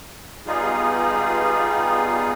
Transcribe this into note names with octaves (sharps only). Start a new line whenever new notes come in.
G3 B3 D#4 F4 G#4